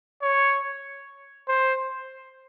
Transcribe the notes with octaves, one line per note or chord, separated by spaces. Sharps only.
C#5
C5